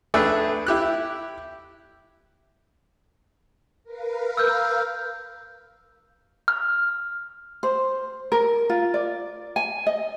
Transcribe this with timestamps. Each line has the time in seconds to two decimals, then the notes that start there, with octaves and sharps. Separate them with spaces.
0.14 A3 D4 G#4 B4 E5 G5
0.67 E4 G4 F#6
3.84 A#4 B4 F5
4.37 E6 F6 G6
6.48 F6
7.63 C5
8.32 A#4
8.70 F4
8.94 D5
9.56 G#5
9.87 D#5